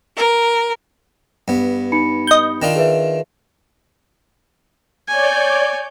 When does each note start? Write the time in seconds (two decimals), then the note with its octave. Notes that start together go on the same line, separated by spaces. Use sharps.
0.16 A#4
1.48 G2 B3
1.92 D#4 B5 C#7
2.27 D#5 G6
2.62 D#3 D4 F4
2.75 G#4 B4 E5
5.08 C#5 D5 G#5 G6